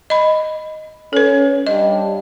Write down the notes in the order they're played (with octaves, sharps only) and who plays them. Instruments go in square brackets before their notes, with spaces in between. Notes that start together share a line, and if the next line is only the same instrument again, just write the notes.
[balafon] D#5 B5
[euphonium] C#4 [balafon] A4 B4
[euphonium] G2 [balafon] D#5